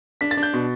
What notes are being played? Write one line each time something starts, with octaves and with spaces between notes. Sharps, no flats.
D4 B6
A6
D4
G6
B2